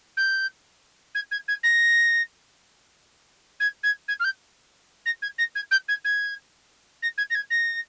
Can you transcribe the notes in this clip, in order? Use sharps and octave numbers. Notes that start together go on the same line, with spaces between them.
G6
G#6
G#6
G#6
A#6
G#6
G#6
G#6
F6
G6
A#6
G#6
A#6
G#6
G6
G#6
G#6
A#6
G#6
A#6
G#6
A#6